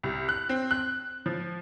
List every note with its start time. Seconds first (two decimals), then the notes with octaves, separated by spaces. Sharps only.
0.03 C2
0.29 F#6
0.49 C4
0.71 F#6
1.26 F3